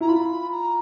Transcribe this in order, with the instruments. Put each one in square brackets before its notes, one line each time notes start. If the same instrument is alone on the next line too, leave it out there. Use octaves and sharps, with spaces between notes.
[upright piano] E4 [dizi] A#5
[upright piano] F4 [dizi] B5
[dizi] A#5